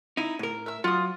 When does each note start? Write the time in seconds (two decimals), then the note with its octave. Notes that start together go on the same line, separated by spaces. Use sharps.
0.17 D#4 E4
0.39 A2 A#4
0.66 E5 E6
0.84 F#3 F4 D#6